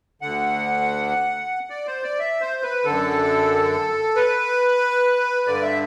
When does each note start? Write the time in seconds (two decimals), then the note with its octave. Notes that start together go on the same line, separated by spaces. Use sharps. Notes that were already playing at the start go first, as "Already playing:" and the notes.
0.22 D2 D3 F#5
1.70 D5
1.87 C5
2.03 D5
2.19 E5
2.41 C5
2.63 B4
2.84 F#2 D3 A4
4.16 B4
5.47 G2 D3 D5
5.62 E5